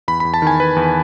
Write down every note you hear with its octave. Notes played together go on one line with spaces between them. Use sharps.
E2 B5
E2 B5
A5
D#3 G#5
D#3 B4
E2